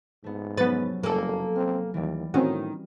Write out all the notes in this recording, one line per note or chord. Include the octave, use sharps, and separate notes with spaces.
G#2 A3 B3
F1 F#3 B3 C#4 B4 A6
F#1 A#3 A4 G#5
C4 F6
D#2 E3 G3
A2 D#3 C4 C#4 F#4